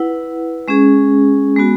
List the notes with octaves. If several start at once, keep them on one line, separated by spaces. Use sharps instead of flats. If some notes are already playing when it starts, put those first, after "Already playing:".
Already playing: E4 B4 F#5
G#3 C#4 G#4
G#3 B3 F#4